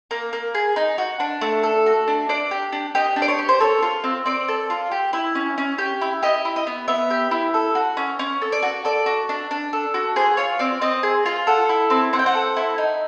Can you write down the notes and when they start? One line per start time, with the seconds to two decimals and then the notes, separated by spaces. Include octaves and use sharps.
0.11 A#3
0.33 A#3
0.55 G#4
0.76 D#4
0.98 F#4
1.20 D4
1.41 A3
1.63 A4
1.86 F#4
2.08 D4
2.29 D4 D5
2.51 G4
2.72 D4
2.95 G4 D#5
3.16 D4
3.22 D5
3.28 C#5
3.39 G4
3.49 C5
3.60 A4 C#5
3.83 F4
4.04 C4
4.26 C4 D5
4.48 A4
4.70 F4
4.91 G4
5.13 E4
5.35 C#4
5.58 C#4
5.78 G4
6.01 E4
6.23 G4 D#5
6.45 E4
6.56 D#5
6.67 B3
6.88 B3 E5
7.10 G4
7.31 E4
7.54 A4
7.75 F#4
7.97 C#4
8.19 C#4
8.42 A4
8.52 D5
8.62 F#4
8.85 A4 D5
9.06 F#4
9.29 D4
9.51 D4
9.73 A4
9.94 F#4
10.16 G#4 C5
10.37 F4 C#5
10.59 C4 D5
10.81 C4 D#5
11.03 G#4
11.26 F4
11.47 A4 F#5
11.69 E4
11.90 C4
12.13 C4 F#5
12.19 G5
12.26 F#5
12.35 A4
12.57 E4
12.78 D#4